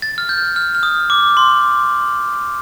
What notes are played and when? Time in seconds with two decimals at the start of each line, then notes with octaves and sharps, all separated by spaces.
0.02 A6
0.18 F6
0.29 G6
0.56 F6
0.75 F6
0.83 D#6
1.10 D6
1.37 C6